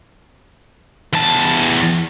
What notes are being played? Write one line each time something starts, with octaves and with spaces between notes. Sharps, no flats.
E2 A5